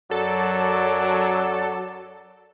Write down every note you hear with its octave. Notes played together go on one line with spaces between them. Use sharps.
F#2 F#3 A4 D5